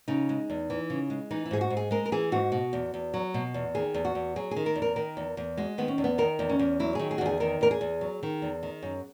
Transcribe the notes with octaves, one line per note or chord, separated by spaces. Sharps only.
C#3 D#4
G#3
E2
E3
C#3
G#3
E3 D#4
E4
G#2 G#4
F#4
G#2
G#4
G#3 A#4
A#4
E3 G#4
G#2 F#4
B2
E2
E2
F#3
B2
E2
D#3 G#4
E2
F#4
E2
F#3 G#4
G#4
D#3
A#4
E2
A#4
D#3 A#4
E2
E2
G#3 F#4
D#3 B3
C#4
E2
B3
D#3 A#4
E2
C#4
E2
F#3 E4
D#3 G#4
G#4
F#4
E2 G#4
D#3 A#4
E2 A#4
G#4
E2
F#3
D#3
E2
D#3
F#2